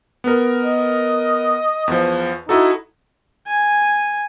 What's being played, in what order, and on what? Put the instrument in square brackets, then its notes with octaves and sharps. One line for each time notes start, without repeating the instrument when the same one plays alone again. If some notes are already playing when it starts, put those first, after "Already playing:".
[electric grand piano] B3 A#4
[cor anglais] D#5
[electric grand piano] E2 F3
[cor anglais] D#4 [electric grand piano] E4 F#4 A4
[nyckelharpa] G#5